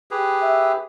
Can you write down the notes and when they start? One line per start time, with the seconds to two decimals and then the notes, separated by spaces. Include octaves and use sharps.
0.11 G4 G#4 B4
0.42 E5